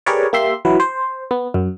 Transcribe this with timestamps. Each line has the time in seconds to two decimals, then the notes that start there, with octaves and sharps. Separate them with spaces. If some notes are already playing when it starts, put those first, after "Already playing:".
0.06 G4 G#4 A#4 B4 C#5 D5
0.33 A#3 G4 E5 C6
0.65 E3 F#3 B4
0.80 C5
1.31 B3
1.54 F#2 F#3